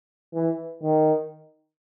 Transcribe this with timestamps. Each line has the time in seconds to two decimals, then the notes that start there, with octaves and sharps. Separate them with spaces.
0.34 E3
0.82 D#3